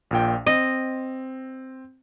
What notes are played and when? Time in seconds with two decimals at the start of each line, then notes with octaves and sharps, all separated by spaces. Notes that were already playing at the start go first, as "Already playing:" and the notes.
0.11 A#1 A#2 G5
0.46 C4 D#5